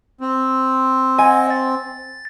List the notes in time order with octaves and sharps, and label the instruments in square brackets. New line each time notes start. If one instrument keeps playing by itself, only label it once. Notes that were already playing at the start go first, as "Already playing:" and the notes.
[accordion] C4
[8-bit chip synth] D#5 F#5 [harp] G#5
[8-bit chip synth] A6